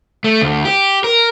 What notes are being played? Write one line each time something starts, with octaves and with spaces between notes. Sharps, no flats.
A3
D2
G4
A#4